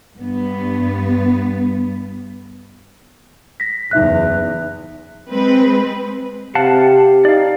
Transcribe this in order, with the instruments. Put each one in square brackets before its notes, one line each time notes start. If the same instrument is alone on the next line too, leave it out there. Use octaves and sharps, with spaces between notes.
[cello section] G2 B3
[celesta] A#6 B6
[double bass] F#1 E2 [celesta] D#4 E5 F#6
[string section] G#3 C4 B4
[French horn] C3 [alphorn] G4 [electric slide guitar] F5 F#5 A5
[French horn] D#4 [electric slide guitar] D5 F5